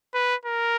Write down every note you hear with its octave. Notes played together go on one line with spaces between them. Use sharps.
B4
A#4